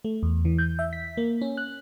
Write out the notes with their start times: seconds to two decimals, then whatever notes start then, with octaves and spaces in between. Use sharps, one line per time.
0.05 A3
0.23 E2
0.45 E3
0.58 G6
0.79 E5
0.93 B6
1.17 A#3
1.41 C#4
1.57 F#6